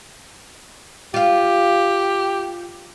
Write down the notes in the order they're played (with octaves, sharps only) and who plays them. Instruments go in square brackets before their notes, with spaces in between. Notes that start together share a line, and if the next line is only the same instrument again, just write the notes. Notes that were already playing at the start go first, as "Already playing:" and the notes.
[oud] F4 F5 [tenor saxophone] G4